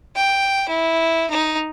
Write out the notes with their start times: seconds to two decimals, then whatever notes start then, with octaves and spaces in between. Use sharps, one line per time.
0.16 G5
0.69 E4
1.30 D#4